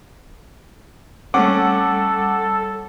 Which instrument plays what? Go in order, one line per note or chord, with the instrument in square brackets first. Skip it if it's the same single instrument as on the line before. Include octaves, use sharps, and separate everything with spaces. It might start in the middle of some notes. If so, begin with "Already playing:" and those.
[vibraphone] G3 [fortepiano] A3 C#4 [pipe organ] A4 [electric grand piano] F#5 D6